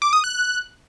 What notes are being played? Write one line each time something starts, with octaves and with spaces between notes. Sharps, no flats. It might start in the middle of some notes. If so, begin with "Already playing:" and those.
D6
D#6
F#6